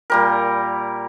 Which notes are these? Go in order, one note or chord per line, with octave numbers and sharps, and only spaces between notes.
A#2 G3 A#4